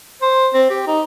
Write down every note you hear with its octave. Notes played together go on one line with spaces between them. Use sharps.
C5
C4
G4
D#4